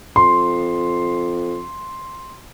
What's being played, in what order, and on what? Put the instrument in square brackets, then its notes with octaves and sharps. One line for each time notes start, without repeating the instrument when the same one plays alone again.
[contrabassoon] F2 [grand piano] C6